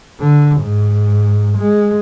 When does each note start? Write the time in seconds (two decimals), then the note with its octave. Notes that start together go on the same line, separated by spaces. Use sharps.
0.20 D3
0.61 G#2
1.58 G#3